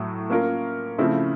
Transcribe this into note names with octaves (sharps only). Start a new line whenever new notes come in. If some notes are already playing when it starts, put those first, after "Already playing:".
Already playing: A2 F#3 A3
A#3 C#4 F4 A#4
C#3 F3 A3 C4 E4